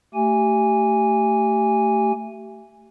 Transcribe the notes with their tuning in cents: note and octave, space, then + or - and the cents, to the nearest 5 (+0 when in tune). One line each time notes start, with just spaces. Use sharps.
A3 +20 G4 -25 G#5 -10